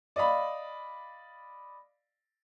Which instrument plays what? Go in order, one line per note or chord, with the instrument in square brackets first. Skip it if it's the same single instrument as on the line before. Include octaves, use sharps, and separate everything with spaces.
[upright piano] D5 D#5 F5 B5